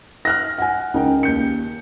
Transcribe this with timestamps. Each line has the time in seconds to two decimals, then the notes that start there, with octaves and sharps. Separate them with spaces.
0.25 F6 F#6 A#6
0.59 F#5 G#5
0.94 C#2 D#4 A#4 G5
1.23 D#2 G6 C#7